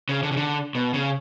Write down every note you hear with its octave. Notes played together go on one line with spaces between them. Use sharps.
C#3
D3
C#3
D3
B2
C#3